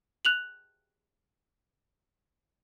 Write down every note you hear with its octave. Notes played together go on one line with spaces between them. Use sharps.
F#6 F7 F#7